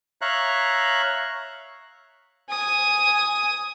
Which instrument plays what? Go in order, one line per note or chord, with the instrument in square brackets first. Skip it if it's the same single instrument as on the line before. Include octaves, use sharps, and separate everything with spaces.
[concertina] C#5 E5 F5 A#5 F#6
[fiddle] G#5 D#6